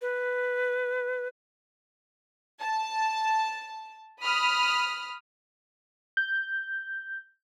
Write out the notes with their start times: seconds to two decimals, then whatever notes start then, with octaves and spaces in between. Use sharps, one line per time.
0.02 B4
2.61 A5
4.22 B5 D#6 F6
6.17 G6